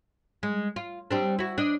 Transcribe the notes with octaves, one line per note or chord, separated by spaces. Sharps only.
G#3
F4
G3 C4 D4
E4 F#4
D4 D#5